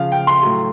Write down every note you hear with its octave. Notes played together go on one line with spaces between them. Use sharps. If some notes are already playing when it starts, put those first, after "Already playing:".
Already playing: C#3 F3 F5
G5
C6
A2 F#3